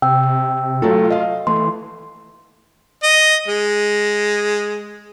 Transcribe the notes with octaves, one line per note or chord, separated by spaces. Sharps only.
C3 G5 E6
F#3 A3 F4 A4
D#5 F5
E3 A3 C6
D#5
G#3